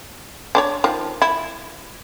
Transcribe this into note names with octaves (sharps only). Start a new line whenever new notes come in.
D4 C5 C#5
D#3 F3
E4